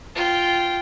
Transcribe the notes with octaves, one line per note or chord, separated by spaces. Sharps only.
F4 G5